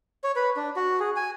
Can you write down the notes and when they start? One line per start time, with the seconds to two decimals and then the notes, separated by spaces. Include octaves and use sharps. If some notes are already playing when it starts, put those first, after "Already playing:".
0.24 C#5
0.36 B4
0.57 D4
0.76 F#4
1.00 G#4
1.16 G#5